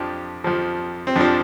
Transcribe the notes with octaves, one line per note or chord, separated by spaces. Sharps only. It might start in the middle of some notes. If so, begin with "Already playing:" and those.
Already playing: F2 F3 D4 G4
F2 F3
C4
F2 F3 D4